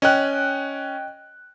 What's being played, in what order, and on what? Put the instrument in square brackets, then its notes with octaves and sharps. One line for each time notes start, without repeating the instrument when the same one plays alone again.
[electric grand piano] C#4 [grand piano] D#5 G5 F#6